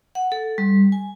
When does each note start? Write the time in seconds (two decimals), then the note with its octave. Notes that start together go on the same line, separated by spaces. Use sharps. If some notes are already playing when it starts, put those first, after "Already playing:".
0.15 F#5
0.32 A4
0.58 G3
0.92 G#5